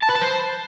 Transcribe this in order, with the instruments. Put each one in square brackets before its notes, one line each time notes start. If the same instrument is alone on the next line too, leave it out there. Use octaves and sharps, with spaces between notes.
[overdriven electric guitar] A5
B4
A5
C5